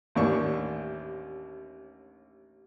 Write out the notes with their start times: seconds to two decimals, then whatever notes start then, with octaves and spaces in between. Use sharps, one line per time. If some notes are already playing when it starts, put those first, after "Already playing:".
0.15 A1 D#2 D4 C#6